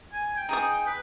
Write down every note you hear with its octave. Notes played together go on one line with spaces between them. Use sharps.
G#5
G5
D#4 G#4 D#6
B4